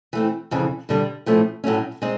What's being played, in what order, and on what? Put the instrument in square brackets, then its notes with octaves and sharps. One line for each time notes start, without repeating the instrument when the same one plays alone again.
[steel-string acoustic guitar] E3 A3 C4
F2 C#3 E3
G2 D3 G3
A2 F3 A3 C#4
A2 F#3 A3 C#4
G#3 C4 D#4